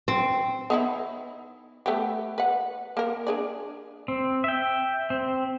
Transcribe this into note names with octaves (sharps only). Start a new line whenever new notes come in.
C4
B3 D#4 E4
A3 B3 G4
B4 F#5
A#3 A#4
D4 G#4 D5
C4
E5 G5
C4